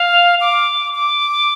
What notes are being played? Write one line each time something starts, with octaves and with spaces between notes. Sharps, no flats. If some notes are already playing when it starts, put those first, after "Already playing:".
Already playing: F5
D6
D6